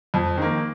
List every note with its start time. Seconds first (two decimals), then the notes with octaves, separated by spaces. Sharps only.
0.14 F2
0.37 D#3 A#3